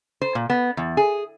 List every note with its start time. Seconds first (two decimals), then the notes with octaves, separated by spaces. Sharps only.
0.21 C5
0.35 A#2
0.50 B3
0.77 E2
0.97 G#4